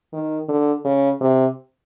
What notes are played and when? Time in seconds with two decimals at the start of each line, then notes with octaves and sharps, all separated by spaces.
0.13 D#3
0.49 D3
0.85 C#3
1.21 C3